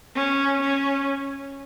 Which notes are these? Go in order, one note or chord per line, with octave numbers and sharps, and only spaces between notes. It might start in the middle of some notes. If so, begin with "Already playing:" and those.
C#4
C#4